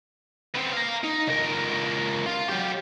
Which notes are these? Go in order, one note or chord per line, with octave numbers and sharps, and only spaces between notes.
B3 C4
F5 A#5
D#4
C#2 A#4
F4
F#3 G4